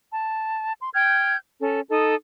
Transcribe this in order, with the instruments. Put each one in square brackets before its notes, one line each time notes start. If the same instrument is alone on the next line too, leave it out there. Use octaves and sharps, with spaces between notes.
[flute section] A5
C6
G5 F6 G6 G#6
C#4 A4
D#4 A4 D#6